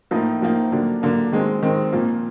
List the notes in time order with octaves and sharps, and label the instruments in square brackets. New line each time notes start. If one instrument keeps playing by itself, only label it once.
[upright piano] A2 F3 A#3 D#4
A2 F3 A#3 D#4
D3 F#3 A#3 D4
D3 F#3 A#3 D4
D#3 G#3 C4
D#3 G#3 C4
A#2 F3 A#3